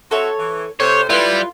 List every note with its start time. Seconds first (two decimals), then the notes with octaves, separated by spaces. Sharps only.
0.11 C4 F#4 A4 C#5 E5
0.39 E3
0.80 C3 A3 C5 C#5
1.10 G3 E4 F4 B4